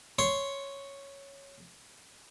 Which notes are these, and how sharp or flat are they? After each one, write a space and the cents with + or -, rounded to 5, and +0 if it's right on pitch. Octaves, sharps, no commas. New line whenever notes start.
C#5 +0 C6 +0